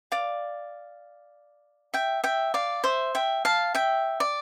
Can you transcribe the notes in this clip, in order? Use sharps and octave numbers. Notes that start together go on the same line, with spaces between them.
D5 F5
E5 G5
E5 G5
D5 F5
C5 E5
E5 G5
F5 A5
E5 G5
D5